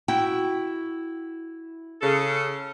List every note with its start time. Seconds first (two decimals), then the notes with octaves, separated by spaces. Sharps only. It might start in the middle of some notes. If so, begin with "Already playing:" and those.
0.08 E4 F#4 G5
2.02 C#3 A4